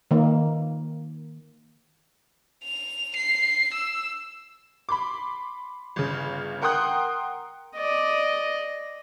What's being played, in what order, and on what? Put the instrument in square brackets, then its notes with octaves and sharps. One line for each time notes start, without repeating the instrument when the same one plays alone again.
[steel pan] D#3 A#3
[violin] F7
C7
E6
[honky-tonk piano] B5 C6 D6
G1 C#3
A#4 F#5 G5 C6 D#6 F#6
[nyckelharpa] D5 D#5